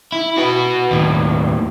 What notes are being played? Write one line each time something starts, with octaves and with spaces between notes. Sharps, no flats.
E4
F#4 B4
D#2 A2